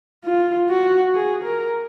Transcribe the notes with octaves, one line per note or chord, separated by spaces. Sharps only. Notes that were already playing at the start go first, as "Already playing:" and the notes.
F4
F#4
G#4
A#4